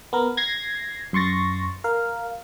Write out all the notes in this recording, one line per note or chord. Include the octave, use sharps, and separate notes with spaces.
B3 A#4
G#6 A#6 C7
F#2 C6 C#6 A6 A#6
A#4 F5